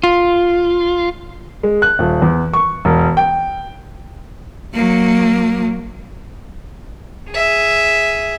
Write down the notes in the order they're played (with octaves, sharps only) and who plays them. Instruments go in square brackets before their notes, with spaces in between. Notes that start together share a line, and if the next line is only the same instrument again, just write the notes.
[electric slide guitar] F4
[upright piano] G#3
F#6
D#1
E2
C#6
E1
G5
[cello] F#3 A#3
[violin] G#4 E5